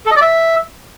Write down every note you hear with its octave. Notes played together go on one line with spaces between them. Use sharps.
A4
D#5
D5
E5